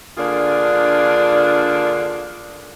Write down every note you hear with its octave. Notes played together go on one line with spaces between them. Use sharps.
D3 A#3 D4 F4 G#4